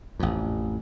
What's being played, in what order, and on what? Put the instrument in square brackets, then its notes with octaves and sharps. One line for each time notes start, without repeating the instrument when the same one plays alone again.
[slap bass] A1 F2